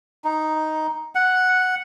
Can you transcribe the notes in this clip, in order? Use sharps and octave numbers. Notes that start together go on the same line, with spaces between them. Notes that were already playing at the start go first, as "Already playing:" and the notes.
D#4
F#5